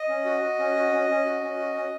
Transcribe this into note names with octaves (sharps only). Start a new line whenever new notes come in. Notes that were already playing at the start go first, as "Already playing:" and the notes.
Already playing: D#5
C#4
F#4
F#4
C#4
F#4
C#4
C#4
F#4
C#4
F#4
C#4